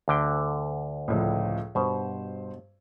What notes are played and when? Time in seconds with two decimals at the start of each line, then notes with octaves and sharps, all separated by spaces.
0.08 D2 D3 G5
1.08 C#2 A2 F3
1.75 G2 B2 C5